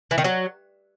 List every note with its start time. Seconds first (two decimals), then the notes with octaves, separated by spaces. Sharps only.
0.11 E3
0.18 D#3
0.24 F#3